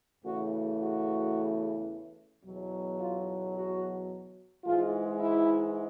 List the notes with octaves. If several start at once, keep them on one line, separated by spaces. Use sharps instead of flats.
E2 C#3 E3 A3 F#4
F#4
E2 B2 F#3
F4
F#4
G#2 E3 G#3 F4
E4